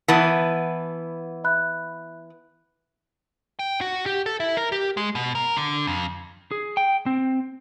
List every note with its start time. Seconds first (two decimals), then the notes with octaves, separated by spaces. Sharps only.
0.08 E3 B3 A5 B5 A6
1.44 E5 B5 F#6
3.59 G5
3.81 F#4
4.06 G4
4.26 A4
4.40 E4
4.57 A#4
4.72 G4
4.97 G#3
5.15 B2
5.35 A#4
5.56 D3
5.87 F2
6.51 G#4
6.77 G5
7.06 C4